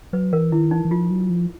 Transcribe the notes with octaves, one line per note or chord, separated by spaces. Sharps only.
F#3 B4
E3 A#4
D#3 E4
E3 D#4
E3
F3 F4
F#3
F3